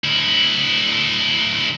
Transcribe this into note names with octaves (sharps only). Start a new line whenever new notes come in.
D2 E4